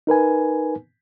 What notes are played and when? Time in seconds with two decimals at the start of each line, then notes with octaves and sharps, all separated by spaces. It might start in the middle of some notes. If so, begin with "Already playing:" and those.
0.07 D#4 A#4 B4 G#5